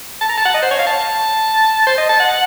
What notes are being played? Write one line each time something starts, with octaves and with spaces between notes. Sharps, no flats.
A5
A#5
A5
F#5
D#5
C5
C#5
F5
A5
C5
D#5
A5
F#5